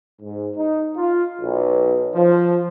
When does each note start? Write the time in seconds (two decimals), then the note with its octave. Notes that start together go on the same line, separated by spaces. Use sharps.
0.21 G#2
0.56 D#4
0.96 F4
1.41 B1
2.15 F3